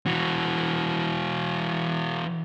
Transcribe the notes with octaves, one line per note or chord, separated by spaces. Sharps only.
E3 F#4